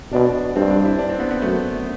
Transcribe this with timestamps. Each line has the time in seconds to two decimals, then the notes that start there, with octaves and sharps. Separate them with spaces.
0.13 B2 D4
0.56 G2 C4
0.70 D4
0.85 E4
0.98 D4
1.09 C4
1.20 B3
1.31 B3
1.42 F#2 A3